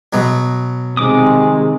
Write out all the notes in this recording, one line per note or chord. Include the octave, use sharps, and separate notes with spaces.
B2 F#3
C3 D#3 G#3 D6 D#6